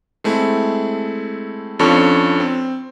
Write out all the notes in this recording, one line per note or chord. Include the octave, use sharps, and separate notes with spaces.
G#3 A3 C4 E4
F2 F3 C#4 D4 A4 C#6
C4